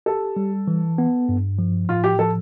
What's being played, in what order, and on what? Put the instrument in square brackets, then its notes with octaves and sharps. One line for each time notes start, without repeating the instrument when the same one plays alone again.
[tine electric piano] G4 [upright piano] A4
[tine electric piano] G3
E3
B3
G2
F3
[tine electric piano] A2 [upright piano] F4
[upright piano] G4
[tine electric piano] F3 [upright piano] A4